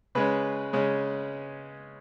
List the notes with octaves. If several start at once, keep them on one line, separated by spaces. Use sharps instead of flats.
C#3 G#3 C#4 B4
C#3 G#3 C#4